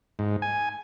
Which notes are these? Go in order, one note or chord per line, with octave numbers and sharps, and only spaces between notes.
G#2
G#5